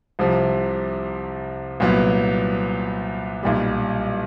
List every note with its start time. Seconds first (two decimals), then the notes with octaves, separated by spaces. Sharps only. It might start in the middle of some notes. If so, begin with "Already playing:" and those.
0.19 C2 C3 F3
1.80 C2 A#2 F#3 B3
3.43 B1 A#2 G3